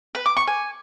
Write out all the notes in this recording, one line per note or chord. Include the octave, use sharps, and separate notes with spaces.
B4
D6
C#6
G#5